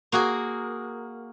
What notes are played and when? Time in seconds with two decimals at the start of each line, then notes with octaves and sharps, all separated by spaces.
0.12 A#3 F#4 G#4 A#4